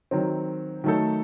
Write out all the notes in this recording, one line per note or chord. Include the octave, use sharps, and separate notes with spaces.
D#3 F#3 C4
D#3 F#3 A3 D#4 A4